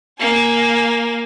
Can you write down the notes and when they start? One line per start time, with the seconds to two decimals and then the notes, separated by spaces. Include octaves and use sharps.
0.20 A#3 G#5